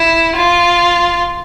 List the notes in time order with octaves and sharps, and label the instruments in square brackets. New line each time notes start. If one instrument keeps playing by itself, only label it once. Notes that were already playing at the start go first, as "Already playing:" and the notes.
Already playing: [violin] E4
F4